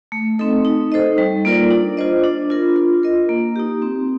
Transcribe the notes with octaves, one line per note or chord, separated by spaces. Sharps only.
A3
C4 D#4 A4 D#5
D#4
A4 C5 D#5
G3
A#3 F4 A#4 D5
D4
F4 C5 D#5
D4
F4 A#4
F4
A#4 D#5
A#3
D#4 G4
C4